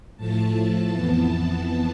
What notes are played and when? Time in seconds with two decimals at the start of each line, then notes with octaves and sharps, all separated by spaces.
0.17 A2 F3 A3 A5
0.92 F2 E3 B3